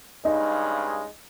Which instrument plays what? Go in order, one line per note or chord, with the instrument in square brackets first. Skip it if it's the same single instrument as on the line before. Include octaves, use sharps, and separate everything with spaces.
[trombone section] G2 C#3 G#3 [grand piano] D#4